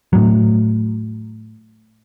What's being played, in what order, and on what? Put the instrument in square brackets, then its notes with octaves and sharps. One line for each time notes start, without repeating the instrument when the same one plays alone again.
[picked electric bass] A2 F#3